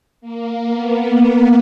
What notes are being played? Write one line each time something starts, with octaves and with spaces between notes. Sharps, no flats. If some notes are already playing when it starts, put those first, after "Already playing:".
A#3
B3